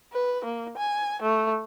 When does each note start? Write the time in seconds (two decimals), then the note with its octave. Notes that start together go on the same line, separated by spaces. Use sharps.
0.13 B4
0.45 A#3
0.77 G#5
1.22 A3